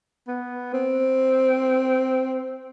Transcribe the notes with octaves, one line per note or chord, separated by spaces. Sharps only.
B3
C4